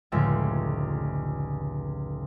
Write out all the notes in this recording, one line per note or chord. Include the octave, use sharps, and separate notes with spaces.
F1 C#2 A2 D3 E5